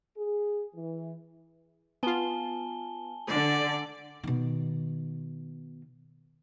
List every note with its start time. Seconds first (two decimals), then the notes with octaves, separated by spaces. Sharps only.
0.17 G#4
0.75 E3
2.03 B3 F4 G#5 A5 G7
3.28 D3 D5
4.23 B2 D#3